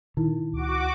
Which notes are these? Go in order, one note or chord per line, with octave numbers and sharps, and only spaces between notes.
A#2 D#3 E4
C#2 F#4 D6